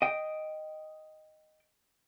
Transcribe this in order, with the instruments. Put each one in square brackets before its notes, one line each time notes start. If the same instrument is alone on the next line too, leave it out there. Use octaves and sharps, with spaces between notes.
[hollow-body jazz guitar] D#5 G5